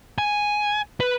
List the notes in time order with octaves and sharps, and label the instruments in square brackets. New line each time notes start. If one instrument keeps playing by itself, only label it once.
[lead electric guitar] G#5
B4